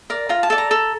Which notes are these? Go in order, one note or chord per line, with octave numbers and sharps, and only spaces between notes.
A#4 D5
F4 A#5
A5
A4 D5
A#5
A4